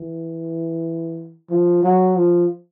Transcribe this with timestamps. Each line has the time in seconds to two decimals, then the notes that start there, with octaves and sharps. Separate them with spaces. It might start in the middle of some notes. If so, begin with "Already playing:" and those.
Already playing: E3
1.50 F3
1.83 F#3
2.16 F3